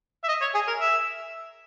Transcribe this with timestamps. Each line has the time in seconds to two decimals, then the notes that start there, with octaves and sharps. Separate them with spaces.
0.24 E5
0.28 D#5
0.41 C#5
0.55 G#4
0.68 A#4
0.80 E5